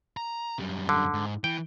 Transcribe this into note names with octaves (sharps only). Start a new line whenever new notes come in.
A#5
F#2 G3
D3
G#2
E3 G5